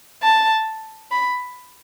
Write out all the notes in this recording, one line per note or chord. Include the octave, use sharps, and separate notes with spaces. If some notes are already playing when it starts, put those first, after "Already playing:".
A5
B5